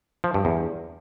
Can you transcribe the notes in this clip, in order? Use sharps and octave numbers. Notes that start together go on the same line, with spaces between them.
F3
G2
E2